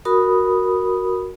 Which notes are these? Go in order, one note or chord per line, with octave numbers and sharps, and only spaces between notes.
F#4 A#4 B5 D#6